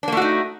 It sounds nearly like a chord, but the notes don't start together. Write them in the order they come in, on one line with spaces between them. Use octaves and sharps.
D4 A#3 A3 F#4 D#4